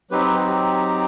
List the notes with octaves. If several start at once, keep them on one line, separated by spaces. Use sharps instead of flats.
F#3 C4 D#4 G4 B4
G4